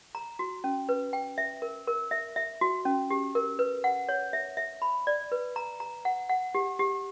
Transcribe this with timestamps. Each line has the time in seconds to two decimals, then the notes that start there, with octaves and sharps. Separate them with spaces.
0.15 A#5
0.39 F#4
0.64 C#4
0.89 B4
1.13 G5
1.38 E5
1.62 A#4
1.87 A#4
2.11 E5
2.36 E5
2.61 F#4
2.85 C#4
3.11 G4
3.35 A#4
3.59 B4
3.84 F#5
4.09 C#5
4.33 E5
4.57 E5
4.82 B5
5.07 D5
5.32 B4
5.56 A#5
5.80 A#5
6.05 F#5
6.30 F#5
6.55 G4
6.79 G4